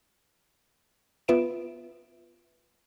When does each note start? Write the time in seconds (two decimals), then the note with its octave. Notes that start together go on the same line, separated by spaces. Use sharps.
1.28 B3 F4 B4 E5 D7 E7